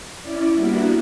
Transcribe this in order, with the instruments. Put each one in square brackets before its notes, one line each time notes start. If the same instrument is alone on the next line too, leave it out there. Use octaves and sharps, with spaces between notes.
[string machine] C#4 E4 D5
G3 A#3 B3 D4 E4 F#4